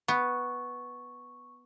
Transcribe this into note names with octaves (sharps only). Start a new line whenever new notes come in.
B3 C#6